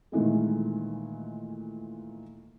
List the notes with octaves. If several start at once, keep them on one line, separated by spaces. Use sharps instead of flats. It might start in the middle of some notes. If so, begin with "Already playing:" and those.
A#2 D#3 E3 G#3 A3